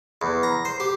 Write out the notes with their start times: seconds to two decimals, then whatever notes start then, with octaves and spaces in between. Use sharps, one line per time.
0.22 E2
0.43 A#5
0.65 C5
0.80 G4